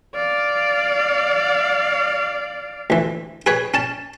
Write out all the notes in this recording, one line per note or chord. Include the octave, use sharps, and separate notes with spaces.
D5 F5
D2 E3
G#4 B4 C#5
C#4 A5